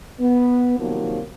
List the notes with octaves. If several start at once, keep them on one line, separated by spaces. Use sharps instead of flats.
B3
C3 D#3 F3 F#3 A#3